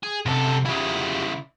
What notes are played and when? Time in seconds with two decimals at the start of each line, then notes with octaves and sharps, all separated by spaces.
0.03 G#4
0.26 F#2 C3 A4
0.66 C#3 E4 F4 G4